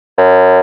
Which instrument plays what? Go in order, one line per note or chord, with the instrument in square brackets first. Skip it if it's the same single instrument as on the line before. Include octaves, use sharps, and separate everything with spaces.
[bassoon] F#2